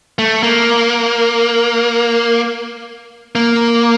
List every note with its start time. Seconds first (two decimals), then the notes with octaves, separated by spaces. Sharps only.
0.19 A3
0.43 A#3
3.35 A#3